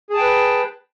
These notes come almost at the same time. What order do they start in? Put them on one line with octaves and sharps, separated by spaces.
G#4 A5 G5 B4